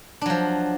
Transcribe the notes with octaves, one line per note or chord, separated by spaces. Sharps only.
F3 F#3 D4